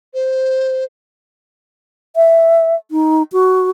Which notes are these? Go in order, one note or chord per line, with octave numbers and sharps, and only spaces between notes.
C5
E5
D#4
F#4